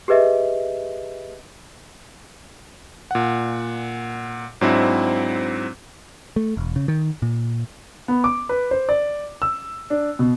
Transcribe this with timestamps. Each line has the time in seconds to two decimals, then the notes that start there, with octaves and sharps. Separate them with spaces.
0.08 G4 G#4 B4 D#5 E5
3.11 A#2 F#5
4.61 G#2 F#3 C4 D4 E4
6.36 A3
6.57 E1
6.76 C#3
6.88 D#3
7.22 A#2
8.08 B3
8.24 D6
8.49 B4
8.71 C5
8.89 D5
9.42 E6
9.90 D4
10.19 B2